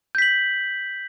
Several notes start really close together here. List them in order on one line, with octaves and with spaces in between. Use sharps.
G6 B6 F#7